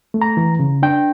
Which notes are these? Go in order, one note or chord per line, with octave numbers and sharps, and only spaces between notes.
A3
A#5
E3
C#3
D4 G5